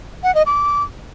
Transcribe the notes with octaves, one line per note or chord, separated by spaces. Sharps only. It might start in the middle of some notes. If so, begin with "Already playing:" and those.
F#5
D#5
D6